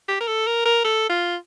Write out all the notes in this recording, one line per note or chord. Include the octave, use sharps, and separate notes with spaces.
G4
A#4
A4
A#4
A#4
A4
F4